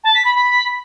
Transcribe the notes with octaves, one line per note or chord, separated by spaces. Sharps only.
A5
B6
B5
B5